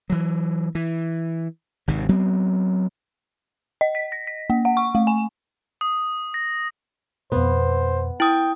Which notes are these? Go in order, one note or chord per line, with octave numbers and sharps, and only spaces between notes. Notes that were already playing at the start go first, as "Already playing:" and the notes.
E3 F#3
E3
G#1 C3 D#3
F#3 B3 C4
D#5
B6
A#6
B6
A#3
F#5
C#6
A3
G#5
D#6
A#6
F2 B2 B3 C5
E4 G5 D#6